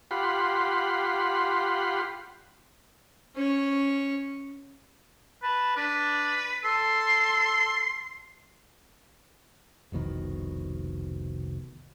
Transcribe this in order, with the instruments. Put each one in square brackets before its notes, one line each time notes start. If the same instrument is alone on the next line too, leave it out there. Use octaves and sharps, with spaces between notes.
[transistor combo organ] F4 G4 F#5 B5 C6
[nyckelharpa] C#4 C#5
[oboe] B4 [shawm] A5
[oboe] D4 [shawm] B4
[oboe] A4 [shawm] C6
[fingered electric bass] F1 C2 B2 D#3